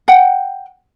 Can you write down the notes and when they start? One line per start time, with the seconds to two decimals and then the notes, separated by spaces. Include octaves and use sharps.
0.08 F#5 G5